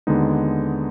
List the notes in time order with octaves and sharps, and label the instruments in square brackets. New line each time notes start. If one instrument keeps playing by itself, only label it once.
[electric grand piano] D#2 D3 G#3 B3 D#4